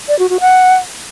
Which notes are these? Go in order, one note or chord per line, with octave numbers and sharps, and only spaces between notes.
D5
F#4
F#4
F#5